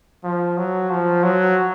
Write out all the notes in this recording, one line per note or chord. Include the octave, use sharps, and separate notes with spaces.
F3
F#3
F3
F#3